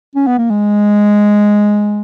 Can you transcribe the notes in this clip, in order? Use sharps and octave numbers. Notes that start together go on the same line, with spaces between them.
C#4
B3
A#3
G#3